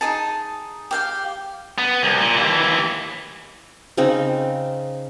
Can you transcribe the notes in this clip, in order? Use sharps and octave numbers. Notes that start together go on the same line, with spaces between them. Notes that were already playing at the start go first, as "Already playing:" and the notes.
D#4 G#4 A5
G4 F5 G5
B3
C2
A#2
D#2 E3
C#3 C4 D#4